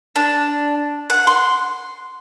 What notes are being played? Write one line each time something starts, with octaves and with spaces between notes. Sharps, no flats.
D4
F#5
C6